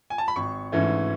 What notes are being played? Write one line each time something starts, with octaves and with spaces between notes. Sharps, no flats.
G#5
A5
B5
G#1 C#6
G#2 E3 A3 C#4